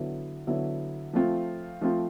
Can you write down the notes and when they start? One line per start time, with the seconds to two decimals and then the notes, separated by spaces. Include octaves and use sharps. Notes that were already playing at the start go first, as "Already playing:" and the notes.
Already playing: D3 F#3 B3 E4
0.47 D3 F#3 B3 E4
1.13 F3 A3 C4 F4
1.81 F3 A3 C4 F4